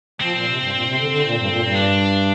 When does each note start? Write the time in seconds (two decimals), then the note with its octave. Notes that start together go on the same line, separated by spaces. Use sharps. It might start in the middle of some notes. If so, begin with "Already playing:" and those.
0.21 F3 C4
0.34 A#2
0.46 C3
0.59 G2
0.72 A#2
0.85 C3
0.98 D3
1.11 D3
1.23 A#2
1.36 G2
1.49 A#2
1.62 G2
1.75 D4